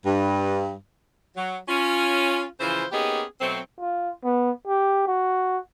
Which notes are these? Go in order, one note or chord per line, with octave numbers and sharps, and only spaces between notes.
G2
F#3
C#4 F4
C#3 E3 F3 E4 C5
A#3 B3 C#4 D#4 G4 G#4
B2 F#3 A3 C4
F4
B3
G4
F#4